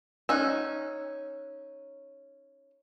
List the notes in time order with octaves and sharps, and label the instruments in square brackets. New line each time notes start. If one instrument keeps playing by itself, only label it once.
[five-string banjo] C#4 D#4 [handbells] E6 F#6